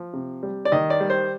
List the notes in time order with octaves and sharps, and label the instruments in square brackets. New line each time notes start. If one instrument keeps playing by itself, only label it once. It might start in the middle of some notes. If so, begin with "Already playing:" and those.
Already playing: [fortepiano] F3
C3
G3
D5
D#3 D#5
D5
G3
C5